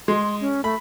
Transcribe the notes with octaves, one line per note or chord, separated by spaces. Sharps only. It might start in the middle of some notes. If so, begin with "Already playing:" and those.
G#3 C6
C#4
A3 B5